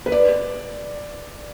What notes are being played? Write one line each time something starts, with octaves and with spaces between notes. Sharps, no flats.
B4
D5